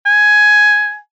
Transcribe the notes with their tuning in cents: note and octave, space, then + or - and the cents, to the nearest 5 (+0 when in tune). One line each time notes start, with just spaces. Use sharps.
G#5 +10